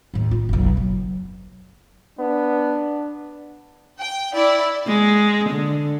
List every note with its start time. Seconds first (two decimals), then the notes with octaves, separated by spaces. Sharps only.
0.14 D#2 A2
0.31 F4
0.49 F#1 B1
0.77 F#3
2.19 B3 D4
3.99 G5
4.34 E4 D5
4.87 G#3
5.50 D3